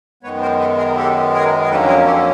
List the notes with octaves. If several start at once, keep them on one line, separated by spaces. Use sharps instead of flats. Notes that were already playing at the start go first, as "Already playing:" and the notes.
F#2 D#3 G#3 B3 B4 C#5
A#4 C5
A4 B4
G#4 A#4
G4 A4
G#4 A#4
A#4
F2 D3 F#3 A#3 C#4 A4 B4
G#4 A#4
G4 A4